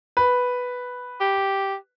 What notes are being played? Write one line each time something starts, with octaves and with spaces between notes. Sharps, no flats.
B4
G4